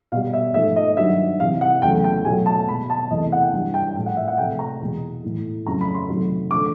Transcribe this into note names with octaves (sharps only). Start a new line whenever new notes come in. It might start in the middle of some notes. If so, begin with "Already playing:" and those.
B2 G3 F5
E5
G#2 F3 A3 E5
D#5
G2 D#3 F#3 E5
C3 E3 G3 F5
F#5
E2 C#3 F#3 A3 G5
G5
B2 F#3 A3 G#5
A5
B2 G#3 B5
A5
E2 C3 E3 A3 D#5
F#5
G5
G2 E3 G3
G5
A2 F3 G#3 G5
F#5
E5
F#5
C3 F3 A3 G5
A#5
E2 B2 G#3
A2 E3 A3
F2 C#3 F#3 A3 A#5
B5
C6
C3 D#3 F#3 A3
D3 F3 A3 D6